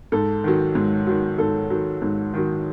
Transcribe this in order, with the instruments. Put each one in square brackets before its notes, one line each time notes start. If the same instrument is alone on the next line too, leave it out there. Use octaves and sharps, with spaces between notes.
[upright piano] G#2 A4
D#3 F#3
G#2
D#3 F#3
G#2 A4
D#3 F#3
G#2
D#3 F#3